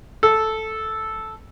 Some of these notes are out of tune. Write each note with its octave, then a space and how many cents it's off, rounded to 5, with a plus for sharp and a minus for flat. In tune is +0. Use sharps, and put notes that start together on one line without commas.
A4 -5